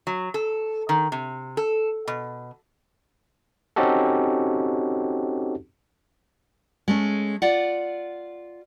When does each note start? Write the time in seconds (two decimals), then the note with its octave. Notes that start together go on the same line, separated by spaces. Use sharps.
0.07 F#3
0.34 A4
0.89 D#3
1.12 C3
1.57 A4
2.08 B2
3.76 C4 C#4 D#4 F#4 G4 A4
6.88 G#3 A3 C#4
7.42 F4 D5 F#5